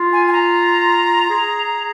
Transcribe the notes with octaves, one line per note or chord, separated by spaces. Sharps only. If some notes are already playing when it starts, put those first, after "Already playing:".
Already playing: F4
G#5
G#5
A#5
G#4